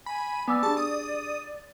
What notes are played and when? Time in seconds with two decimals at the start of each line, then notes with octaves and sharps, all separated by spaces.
0.06 G#5 B5
0.48 B3 D5 G#5 D6 E6
0.63 D4 G4 G#4 A5
0.77 D#6